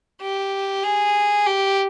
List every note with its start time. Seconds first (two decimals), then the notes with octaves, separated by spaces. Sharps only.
0.22 G4
0.84 G#4
1.46 G4